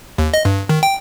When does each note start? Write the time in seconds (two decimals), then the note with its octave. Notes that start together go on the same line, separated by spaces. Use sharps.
0.18 D#2
0.34 D#5
0.45 G2
0.69 D#3
0.83 G5